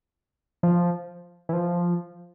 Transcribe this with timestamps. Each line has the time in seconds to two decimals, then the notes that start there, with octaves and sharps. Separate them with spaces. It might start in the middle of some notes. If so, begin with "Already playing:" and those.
0.63 F3
1.49 E3
1.53 F3